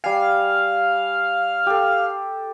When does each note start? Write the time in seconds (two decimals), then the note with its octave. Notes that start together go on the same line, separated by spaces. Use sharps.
0.04 G3 F5 G#5
1.66 G4 A4